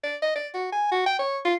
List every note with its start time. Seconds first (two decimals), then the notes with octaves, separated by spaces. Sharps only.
0.04 D5
0.22 D#5
0.36 D5
0.54 F#4
0.72 G#5
0.92 F#4
1.06 G5
1.19 C#5
1.45 F4